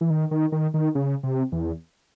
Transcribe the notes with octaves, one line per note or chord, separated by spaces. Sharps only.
E3
D#3
D#3
D#3
D#3
C#3
C3
E2